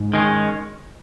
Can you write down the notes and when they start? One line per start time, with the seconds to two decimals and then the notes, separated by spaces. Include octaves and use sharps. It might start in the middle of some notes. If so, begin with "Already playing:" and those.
Already playing: G#2
0.14 D#3 G#3 C#4